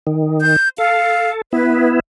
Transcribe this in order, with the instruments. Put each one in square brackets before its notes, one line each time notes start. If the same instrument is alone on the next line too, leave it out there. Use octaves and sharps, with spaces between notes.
[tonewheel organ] D#3
[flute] G6
[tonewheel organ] A4 [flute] F5
[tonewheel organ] B3 E4 [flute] B4